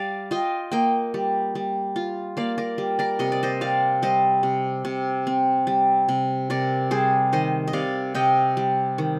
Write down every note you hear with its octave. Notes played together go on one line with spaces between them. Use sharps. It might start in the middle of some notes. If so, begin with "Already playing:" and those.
Already playing: G3 D5 F5
F4 D#5 G5
A#3 D#5 G5
G3
G3
F4
A#3 D5 F5
A#4 D5
G3
A#4 D5
C3 D#5
D5
C5 D#5
C4 D5 F5
G3 C5 D#5
C3
C3
C4
G3
C3
C3 A#4 D5
G3 G#4 C5
D#3 C5 D#5
D#5
C3 D5 F5
C3 D#5 G5
G3
D#3